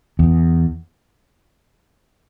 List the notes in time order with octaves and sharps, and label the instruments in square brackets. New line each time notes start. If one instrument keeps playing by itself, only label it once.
[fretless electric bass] E2